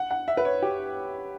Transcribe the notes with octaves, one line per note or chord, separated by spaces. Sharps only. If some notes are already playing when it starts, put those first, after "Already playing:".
Already playing: F#5
F#5
E5
B4
C#5
G4